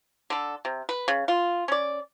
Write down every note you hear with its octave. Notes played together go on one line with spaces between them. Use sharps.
D3 A4
C3
B4
C#3
F4
C#4 D5